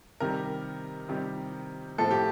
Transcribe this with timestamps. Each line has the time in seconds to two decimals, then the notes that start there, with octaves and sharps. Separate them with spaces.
0.20 C3 D#3 G3 A#4
1.09 C3 D#3 G3
1.98 A2 F3 A3 C4 A4
2.11 G4